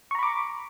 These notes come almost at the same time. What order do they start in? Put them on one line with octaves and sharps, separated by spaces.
C#6 A#5 B5 D6